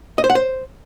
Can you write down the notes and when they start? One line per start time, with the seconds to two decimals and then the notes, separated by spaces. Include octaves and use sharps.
0.18 D#5
0.24 C5
0.30 F#5
0.35 C5